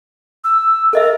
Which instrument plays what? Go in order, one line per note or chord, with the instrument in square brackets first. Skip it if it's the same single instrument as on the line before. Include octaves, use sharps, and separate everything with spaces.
[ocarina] E6
[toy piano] A4 D#5 E5 [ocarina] A#4